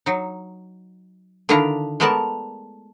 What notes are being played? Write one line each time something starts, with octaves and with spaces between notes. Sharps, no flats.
F#3 D#4
D3 D#3 D4 E4 F4 A#5
G#3 A3 B3 A#4 D5 A5